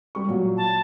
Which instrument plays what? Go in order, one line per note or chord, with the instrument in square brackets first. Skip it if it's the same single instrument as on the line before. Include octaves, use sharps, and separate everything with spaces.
[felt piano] G3 C#6
A#2 F#3
[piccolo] A5